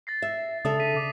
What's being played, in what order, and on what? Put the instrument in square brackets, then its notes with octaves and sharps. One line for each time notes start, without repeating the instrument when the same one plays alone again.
[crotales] A6 A#6 C7
[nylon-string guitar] E5
[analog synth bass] C#3 [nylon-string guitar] D4 A4 E5 [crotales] D#6
[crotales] B6 C7 D#7
D6